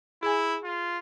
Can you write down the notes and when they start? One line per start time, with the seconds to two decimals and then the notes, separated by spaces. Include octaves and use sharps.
0.23 E4 G#4 G#5
0.64 F4